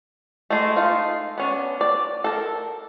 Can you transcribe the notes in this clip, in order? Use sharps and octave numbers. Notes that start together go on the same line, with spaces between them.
G#3 A3
G#3 A3 D#4 F4
B3 C#4 D4
D5
A4 A#4